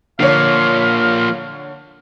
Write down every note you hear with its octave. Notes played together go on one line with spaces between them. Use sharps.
D3 F3 A#3 C#5 F5